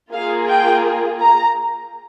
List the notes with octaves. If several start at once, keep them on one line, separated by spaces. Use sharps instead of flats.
A#3 F4 G#4 F5
G5
A#5